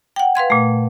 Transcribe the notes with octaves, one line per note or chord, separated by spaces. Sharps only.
F#5 G5
B4 F5 C6 G#6
A#2 A3